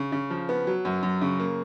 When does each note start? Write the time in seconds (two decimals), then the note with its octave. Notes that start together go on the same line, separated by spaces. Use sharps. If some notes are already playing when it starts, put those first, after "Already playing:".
Already playing: C#3
0.12 C#3
0.30 F3
0.49 B3
0.67 F#3
0.85 F#2
1.03 F#2
1.21 C#3
1.39 A#3